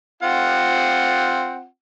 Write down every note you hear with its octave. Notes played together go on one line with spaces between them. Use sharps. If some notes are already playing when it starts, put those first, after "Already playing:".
C4 F4 F#5